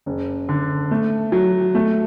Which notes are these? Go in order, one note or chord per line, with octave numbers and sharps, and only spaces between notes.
F#1
D3
A3
F#3
A3